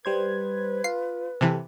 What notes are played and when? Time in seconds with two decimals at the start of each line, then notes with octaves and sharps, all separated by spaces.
0.05 G3 B4 C5 G#6
0.84 F4 C7
1.41 C3 E3 G4 A4